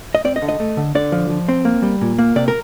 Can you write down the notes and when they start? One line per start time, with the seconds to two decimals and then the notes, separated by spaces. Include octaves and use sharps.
0.15 D#5
0.25 C4 D5
0.36 D#5
0.42 D3
0.48 D#5
0.60 A3
0.77 D3
0.95 D3 D5
1.12 F3
1.30 F3
1.49 C4
1.65 A#3
1.83 G3
2.01 A#2
2.18 A#3
2.36 C3 D5
2.48 A#4